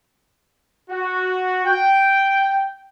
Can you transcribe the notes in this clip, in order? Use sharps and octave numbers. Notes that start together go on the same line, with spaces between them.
F#4
G5